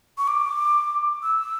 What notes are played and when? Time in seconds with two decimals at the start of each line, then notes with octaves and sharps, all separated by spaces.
0.18 C#6
0.28 D6
1.23 E6